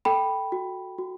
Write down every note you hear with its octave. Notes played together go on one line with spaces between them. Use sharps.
A4 G5 B5
F#4
F#4